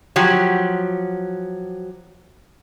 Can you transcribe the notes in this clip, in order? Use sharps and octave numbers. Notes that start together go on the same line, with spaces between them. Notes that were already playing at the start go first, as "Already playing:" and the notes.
F3 F#3 G4